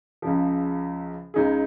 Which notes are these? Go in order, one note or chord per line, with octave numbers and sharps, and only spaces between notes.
C#2 C#3 F3
C#2 C#3 G#3 D#4 G#4